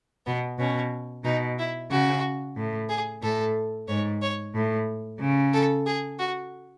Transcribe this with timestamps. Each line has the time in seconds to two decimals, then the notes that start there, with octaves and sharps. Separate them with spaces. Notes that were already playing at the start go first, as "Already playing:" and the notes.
0.27 B2 B3
0.59 B2 C#4
1.25 B2 D#4
1.59 E4
1.90 C#3 F#4
2.57 A2
2.89 G#4
3.23 A2 A4
3.88 G#2 C#5
4.22 C#5
4.55 A2
5.20 C#3
5.54 A4
5.86 G#4
6.19 F#4